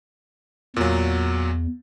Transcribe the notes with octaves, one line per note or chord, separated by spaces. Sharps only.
E2 A#2 F#3